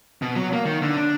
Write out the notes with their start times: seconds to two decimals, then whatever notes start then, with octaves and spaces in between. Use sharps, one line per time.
0.22 B2
0.36 F#3
0.53 A#3
0.65 D#3
0.82 D3
0.96 D4